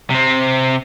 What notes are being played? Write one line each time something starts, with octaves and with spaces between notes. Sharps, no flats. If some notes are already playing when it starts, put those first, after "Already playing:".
C3 C4